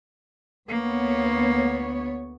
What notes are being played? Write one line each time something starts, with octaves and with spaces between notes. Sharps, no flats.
D2 A#3 B3 C#5